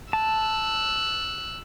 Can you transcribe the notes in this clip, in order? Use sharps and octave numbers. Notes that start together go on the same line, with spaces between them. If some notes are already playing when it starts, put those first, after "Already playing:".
A5 E6 F#6